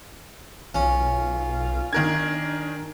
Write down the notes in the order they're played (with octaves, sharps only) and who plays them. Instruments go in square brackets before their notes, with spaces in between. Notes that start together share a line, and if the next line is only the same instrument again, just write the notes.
[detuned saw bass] B1 [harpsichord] C#4 [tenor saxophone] F4
[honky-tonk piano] D#3 A#4 G#6 [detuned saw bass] D4